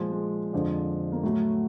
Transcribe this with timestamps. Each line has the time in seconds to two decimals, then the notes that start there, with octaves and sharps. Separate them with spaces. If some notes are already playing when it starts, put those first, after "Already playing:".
Already playing: A#2 F3 G#3
0.12 G#3
0.53 F2 D3 F3
1.12 A#3
1.23 A2 F#3 A3